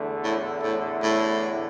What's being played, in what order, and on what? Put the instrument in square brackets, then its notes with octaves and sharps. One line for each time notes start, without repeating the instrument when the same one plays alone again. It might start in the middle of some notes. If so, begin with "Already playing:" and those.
Already playing: [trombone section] E2 D3 A3
[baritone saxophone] A2
A2
A2